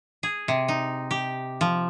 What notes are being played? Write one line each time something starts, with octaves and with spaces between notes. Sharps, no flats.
G#4
C3
D#4
G4
F3